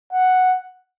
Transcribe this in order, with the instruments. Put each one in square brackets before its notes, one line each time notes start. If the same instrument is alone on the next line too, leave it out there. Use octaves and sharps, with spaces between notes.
[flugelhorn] F#5